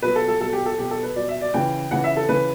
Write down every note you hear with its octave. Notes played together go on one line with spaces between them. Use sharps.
B2 F#3 B4
A4
A4
B2 F#3 A4
G4
A4
B2 F#3 G4
A4
B4
B2 F#3 D5
E5
D5
C#3 E3 G5
C#3 E3 F#5
E5
A4
C#3 E3 B4